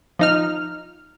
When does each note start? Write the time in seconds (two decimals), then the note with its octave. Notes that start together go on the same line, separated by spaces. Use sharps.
0.19 F3 D#4 F6